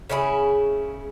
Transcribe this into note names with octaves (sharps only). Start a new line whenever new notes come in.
C#3 C#4 E4 G#4